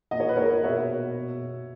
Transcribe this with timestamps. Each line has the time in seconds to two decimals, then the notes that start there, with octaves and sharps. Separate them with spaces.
0.11 A#2 D#5
0.20 C#5
0.29 B4
0.36 A#2 A#4 C#5
0.63 B2 C#5 E5
0.90 B2
1.16 B2
1.42 B2